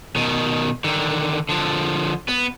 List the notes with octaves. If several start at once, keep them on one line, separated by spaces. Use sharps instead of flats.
B2 D#3
D3 D#3
D3 F3
B3